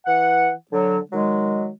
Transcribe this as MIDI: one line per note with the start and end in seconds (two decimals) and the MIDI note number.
0.06 0.50 52
0.06 0.50 78
0.71 0.98 50
0.71 0.98 54
1.12 1.69 51
1.12 1.69 54
1.12 1.69 56